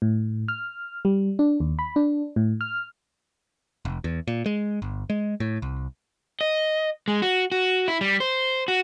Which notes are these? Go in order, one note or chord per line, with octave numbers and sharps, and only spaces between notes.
A2
F6
G3
D4
D#2
B5
D4
A2
F6
F1
E2
A#2
G#3
G1
G#3
A2
C2
D#5
G#3
F#4
F#4
E4
G3
C5
F#4